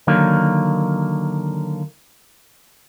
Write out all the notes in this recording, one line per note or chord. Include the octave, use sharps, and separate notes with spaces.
D3 D#3 F#3 A#3